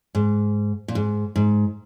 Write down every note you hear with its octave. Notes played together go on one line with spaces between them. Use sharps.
G#2
A#2
G#2
G#2